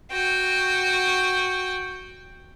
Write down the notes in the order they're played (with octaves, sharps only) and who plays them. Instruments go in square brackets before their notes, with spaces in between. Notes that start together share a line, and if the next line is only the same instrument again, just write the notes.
[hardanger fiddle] F#4 G5